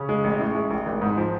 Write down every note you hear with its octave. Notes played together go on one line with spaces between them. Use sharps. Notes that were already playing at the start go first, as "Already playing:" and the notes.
Already playing: C#3 C#4
G#3
A1
A2
G#3
A1
G#1
G#2
F3